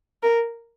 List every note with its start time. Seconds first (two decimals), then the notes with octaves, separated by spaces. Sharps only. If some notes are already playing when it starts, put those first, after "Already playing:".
0.23 A#4